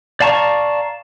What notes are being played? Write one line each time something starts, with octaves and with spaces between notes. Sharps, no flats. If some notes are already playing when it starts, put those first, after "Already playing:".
D5 F5 A5 A#5 C#6